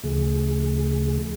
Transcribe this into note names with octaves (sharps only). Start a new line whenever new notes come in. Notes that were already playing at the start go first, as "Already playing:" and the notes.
D2 C#3 F3 A3 G#4